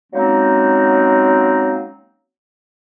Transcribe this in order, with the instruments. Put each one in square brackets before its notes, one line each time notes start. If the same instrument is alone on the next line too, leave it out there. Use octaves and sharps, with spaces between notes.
[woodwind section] F#3 G#3 A#3 C4 C#4 D#4